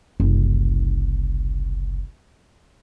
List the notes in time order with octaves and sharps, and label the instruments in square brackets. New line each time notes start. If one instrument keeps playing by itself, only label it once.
[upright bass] F#1 C2